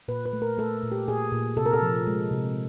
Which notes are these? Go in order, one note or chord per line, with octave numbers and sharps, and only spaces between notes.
A#2 B4
B4
A3
A#4
A3 A4
A#2
G4
A#2 G#4
A#2
C3 A4
A#4
A4
F3
G#3
C3